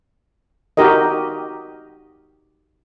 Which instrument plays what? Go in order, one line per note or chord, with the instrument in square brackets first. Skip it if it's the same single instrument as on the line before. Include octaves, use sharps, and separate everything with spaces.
[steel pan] D#4 F#4 G4 A#4 D#5